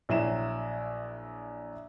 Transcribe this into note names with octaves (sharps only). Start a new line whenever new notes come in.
A#1 F#3 E4 E7